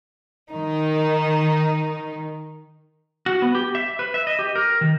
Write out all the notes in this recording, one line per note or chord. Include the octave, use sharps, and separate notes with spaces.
D#3 D#4
F#4
B3
G4
E5
B4
E5
D#5
G4
A#4
D#3